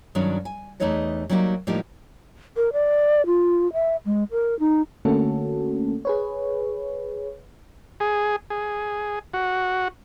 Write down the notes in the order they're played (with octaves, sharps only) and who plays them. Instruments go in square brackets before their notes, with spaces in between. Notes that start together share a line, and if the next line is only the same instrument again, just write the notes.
[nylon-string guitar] G2 D#3 F#3 C#4 D4
G#5
E2 A3 D#4 B4 C#5 D#5
F#3 G3 A#3 D#4 G4
A2 F3 G3 A#3 D#4 G4
[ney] A#4
D5
F4
E5
G#3
A#4
D#4
[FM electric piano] D3 A3 A#3 C#4 F#4 A4
G#4 B4 C#5
[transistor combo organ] G#4
G#4
F#4